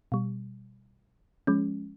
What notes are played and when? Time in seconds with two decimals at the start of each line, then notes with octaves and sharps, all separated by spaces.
0.12 B2 G3
1.47 F3 G#3 C#4